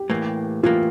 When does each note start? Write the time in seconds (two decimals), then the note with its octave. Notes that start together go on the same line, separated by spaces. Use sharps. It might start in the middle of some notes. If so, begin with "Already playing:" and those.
Already playing: G4
0.10 A2 E3 A#3
0.63 A2 E3 A#3 F4